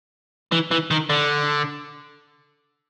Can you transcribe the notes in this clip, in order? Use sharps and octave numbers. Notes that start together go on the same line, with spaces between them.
E3
E3
D#3
D3